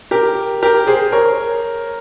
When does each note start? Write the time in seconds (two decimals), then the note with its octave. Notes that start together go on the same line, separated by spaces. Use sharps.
0.11 G4 A#4
0.62 G4 A#4
0.87 G#4 C5
1.12 A#4 C#5